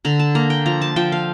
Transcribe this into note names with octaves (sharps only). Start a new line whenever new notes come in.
D3 A#5
A5
A#3 A#5
G5
F3 A#5
A5
F3 G5
F5